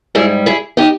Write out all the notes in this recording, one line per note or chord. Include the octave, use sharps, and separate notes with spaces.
G#2 G3 E4 G#4
E4 G#4
D#4 G4